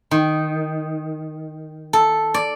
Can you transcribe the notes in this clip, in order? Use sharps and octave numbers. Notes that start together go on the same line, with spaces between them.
D#3
A4
D5